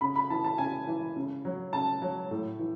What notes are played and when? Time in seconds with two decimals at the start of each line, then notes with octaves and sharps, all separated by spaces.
0.01 C#3 B5
0.16 B5
0.30 E3 A5
0.44 A5
0.58 C#3 G#5
0.87 E3
1.16 C#3
1.45 F#3
1.73 C#3 A5
2.02 F#3
2.31 A2
2.59 E3